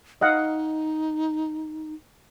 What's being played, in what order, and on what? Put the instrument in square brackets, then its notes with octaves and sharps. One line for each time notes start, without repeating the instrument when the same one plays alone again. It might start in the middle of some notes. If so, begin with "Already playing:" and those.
[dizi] D#4 [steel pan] D#5 F5 F#5